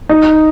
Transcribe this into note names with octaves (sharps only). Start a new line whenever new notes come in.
D#4